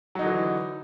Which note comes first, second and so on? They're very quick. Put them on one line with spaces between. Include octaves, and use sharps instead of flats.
F#3 D#4 D3 E3